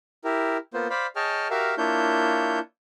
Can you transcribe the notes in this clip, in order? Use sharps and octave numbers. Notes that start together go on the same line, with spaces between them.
E4 G4 A#4
A#3 B3 F4 C5
C5 D5 F5 B5
G#4 C#5 D#5 G5 A5 F6
F#4 G4 A#4 E5 F5
A#3 D4 E4 F4 C#5 G6